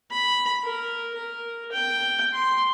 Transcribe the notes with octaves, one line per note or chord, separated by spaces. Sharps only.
B5
A#4
A#4
G5
C6